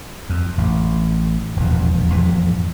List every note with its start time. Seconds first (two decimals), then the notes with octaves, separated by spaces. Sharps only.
0.30 F2
0.58 A1
1.56 E1 A#1 D#2
2.13 A#1 F2 G#2 E3